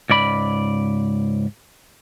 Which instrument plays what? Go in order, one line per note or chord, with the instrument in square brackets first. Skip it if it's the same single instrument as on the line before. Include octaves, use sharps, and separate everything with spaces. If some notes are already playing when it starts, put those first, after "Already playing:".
[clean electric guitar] C#2 G#2 D5 B5